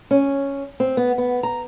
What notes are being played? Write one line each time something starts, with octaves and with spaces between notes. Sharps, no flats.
C#4
C4
B3
B3
A#5